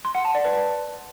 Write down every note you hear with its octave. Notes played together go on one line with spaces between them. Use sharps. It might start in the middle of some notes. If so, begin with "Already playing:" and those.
C6
F#5
A5
D5
B4